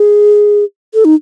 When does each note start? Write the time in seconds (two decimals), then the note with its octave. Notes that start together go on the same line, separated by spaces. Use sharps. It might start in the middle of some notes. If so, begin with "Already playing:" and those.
Already playing: G#4
0.94 A4
1.05 D#4